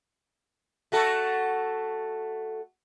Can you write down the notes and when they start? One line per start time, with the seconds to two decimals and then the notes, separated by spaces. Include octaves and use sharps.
0.92 A3 F#4 A4